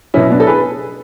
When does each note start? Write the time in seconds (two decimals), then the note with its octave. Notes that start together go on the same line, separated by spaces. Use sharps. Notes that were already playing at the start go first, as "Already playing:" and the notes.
0.14 B2 F#3 C#4 E4
0.31 B3 D4
0.40 A4
0.47 G#4 B4